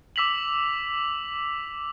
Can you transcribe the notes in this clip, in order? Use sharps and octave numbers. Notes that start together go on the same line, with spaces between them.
D6 E6 B6 F7 F#7